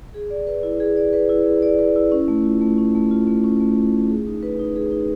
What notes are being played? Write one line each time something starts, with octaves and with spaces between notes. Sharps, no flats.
G#4
D5
B4
E4
G#4
D5
B4
E4
G#4
D5
B4
E4
C#4
A3
F4
A3
C#4
A3
F4
A3
C#4
A3
F4
A3
G#4
D#4
B4
D#4
G#4
D#4